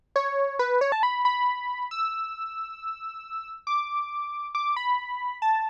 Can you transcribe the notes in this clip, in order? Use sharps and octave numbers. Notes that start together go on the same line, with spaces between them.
C#5
B4
C#5
A5
B5
B5
E6
D6
D6
B5
A5